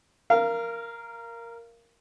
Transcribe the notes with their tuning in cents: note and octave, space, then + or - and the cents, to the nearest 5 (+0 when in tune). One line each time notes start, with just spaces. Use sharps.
A#4 +0 F5 -25